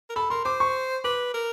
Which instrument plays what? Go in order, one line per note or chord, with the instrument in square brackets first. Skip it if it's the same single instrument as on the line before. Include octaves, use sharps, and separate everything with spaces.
[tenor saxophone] A#4
[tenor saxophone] A4 [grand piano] B5
[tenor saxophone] A#4 [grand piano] C6
[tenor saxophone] C5 [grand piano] D6
[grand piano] C#6
[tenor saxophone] B4 [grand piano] D6
[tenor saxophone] A#4